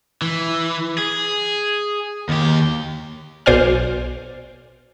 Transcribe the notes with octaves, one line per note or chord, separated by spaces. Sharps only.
E3
G#4
D#2 G4
B1 B2 C5 D5 G#5 F6